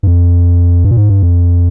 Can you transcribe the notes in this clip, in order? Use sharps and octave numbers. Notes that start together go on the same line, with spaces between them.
G2
F2
G2
A#2
G#2
G2
F2